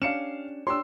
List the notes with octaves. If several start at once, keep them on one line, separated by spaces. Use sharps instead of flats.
C#4 D4 G4 F5 C#7 E7
D4 G4 C#5 C6 E6